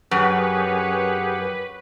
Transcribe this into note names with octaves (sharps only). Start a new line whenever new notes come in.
F#2 C#4 G4 G#4 B4 C#5 F#5